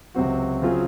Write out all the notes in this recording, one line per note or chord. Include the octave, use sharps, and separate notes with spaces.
C#2 C3 F#3 C4 F#4
C#3 F#3 C4 F4 G#4